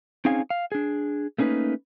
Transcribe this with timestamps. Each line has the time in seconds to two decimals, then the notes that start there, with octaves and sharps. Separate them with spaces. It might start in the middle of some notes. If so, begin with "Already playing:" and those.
0.25 C4 C#4 D#4 G#4 F5 G#5
0.50 F5
0.72 D4 G#4
1.38 A3 A#3 C#4 D#4 B4